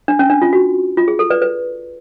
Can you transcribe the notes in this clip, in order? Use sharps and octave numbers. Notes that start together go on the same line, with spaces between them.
D4
C#4
D4
F4
F#4
F4
G#4
A4
B4 D5
B4